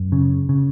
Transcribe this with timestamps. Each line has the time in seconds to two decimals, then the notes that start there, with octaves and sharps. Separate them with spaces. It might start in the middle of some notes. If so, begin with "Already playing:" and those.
Already playing: F#2
0.12 C#3
0.49 C#3